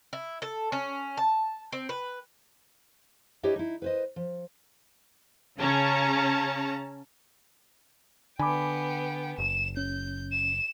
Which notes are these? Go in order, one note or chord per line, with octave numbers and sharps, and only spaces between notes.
E4
A4
C#4
A5
C4
B4
D4 E4 G4 B4 C#5 D#5
D#4 E4
B4 C5 D#5
F3
C#3 C#4 A5 A#5
D3 B3 G5 G#5 B5 D6
F#1 E7
C#4 G6
E7